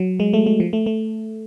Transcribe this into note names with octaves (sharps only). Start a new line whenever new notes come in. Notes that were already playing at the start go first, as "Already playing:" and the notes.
Already playing: F#3
G#3
A3
A3
F3
A3
A3